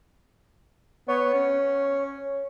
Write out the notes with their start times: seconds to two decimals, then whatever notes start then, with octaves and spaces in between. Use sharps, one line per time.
1.08 B3 C#5
1.34 C#4